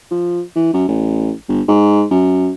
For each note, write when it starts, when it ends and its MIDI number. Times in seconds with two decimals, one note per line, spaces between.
0.11 0.41 53
0.55 0.70 52
0.73 0.84 42
0.88 1.31 33
1.48 1.61 31
1.68 2.04 44
2.11 2.51 42